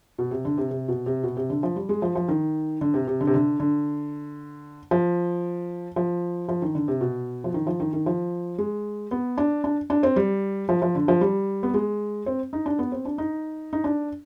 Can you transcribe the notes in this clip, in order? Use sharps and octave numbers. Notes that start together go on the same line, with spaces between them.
B2
C3
D3
C3
C3
B2
C3
B2
C3
D3
F3
G3
G#3
F3
F3
D#3
D3
C3
C3
D3
C3
D3
D3
F3
F3
F3
D#3
D3
C3
B2
F3
D#3
F3
D#3
D#3
F3
G#3
B3
D4
D4
D4
C4
G3
F3
F3
D3
F3
G3
B3
G#3
C4
D#4
D4
B3
C4
D4
D#4
D#4
D4